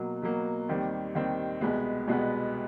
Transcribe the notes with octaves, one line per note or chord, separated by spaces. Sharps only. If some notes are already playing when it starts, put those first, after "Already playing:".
Already playing: B2 F#3 A#3
B2 F#3 A#3
D#2 D#3 G3 C4
D#2 D#3 G3 C4
C2 B2 G#3 B3
C2 B2 G#3 B3